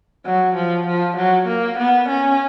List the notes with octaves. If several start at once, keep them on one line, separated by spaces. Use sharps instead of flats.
F#3
F3
F3
F#3
A#3
B3
C#4